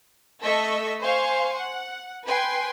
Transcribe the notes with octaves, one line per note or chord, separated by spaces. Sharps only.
A3 A4 D#5 C#6 E6 B6
C5 F5 G#5 C6 C#6
F#5
B4 G5 G#5 C6